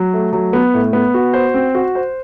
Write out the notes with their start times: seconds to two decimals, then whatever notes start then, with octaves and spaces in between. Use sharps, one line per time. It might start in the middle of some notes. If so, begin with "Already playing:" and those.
Already playing: F#3
0.13 A3
0.33 F#3
0.53 B3
0.74 A2
0.93 B3
1.14 F#4
1.33 C5
1.54 C4
1.75 F#4
1.95 C5